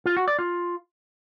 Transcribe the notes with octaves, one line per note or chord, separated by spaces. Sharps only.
F4
F#4
D5
F4